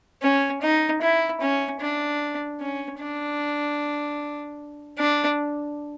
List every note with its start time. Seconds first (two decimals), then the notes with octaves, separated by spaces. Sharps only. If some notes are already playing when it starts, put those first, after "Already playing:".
0.22 C#4
0.62 D#4
1.02 E4
1.41 C#4
1.81 D4
2.60 C#4
3.00 D4
4.98 D4